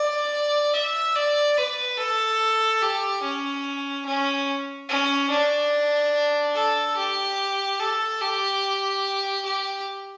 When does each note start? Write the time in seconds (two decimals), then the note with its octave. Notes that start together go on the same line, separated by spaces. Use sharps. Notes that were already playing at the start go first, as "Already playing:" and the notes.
Already playing: D5
0.74 E5
1.15 D5
1.57 B4
1.98 A4
2.82 G4
3.23 C#4
4.06 C#4
4.89 C#4
5.30 D4
6.55 A4
6.96 G4
7.79 A4
8.21 G4
9.45 G4